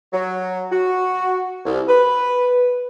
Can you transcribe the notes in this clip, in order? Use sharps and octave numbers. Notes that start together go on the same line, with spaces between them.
F#3
F#4
C2
B4